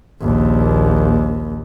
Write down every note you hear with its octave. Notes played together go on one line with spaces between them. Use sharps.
A#1 D#2